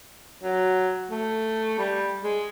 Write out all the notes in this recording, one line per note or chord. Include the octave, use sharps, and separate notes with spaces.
F#3
A3
G3
G#3